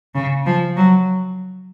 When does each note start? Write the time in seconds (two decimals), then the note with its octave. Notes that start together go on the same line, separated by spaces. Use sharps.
0.15 C#3
0.46 F3
0.77 F#3